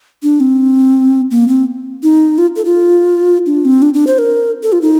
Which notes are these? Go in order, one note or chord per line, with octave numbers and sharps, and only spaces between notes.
D4
C4
A#3
C4
D#4
F4
A4
F4
D4
C4
D4
D4
C5
A#4
A4
F4
D#4